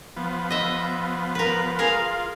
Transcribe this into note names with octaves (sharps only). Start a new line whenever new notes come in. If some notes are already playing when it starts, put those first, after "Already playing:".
F3 B3
D#5 E5
A#4 B4
F4 G#4 A#4 F5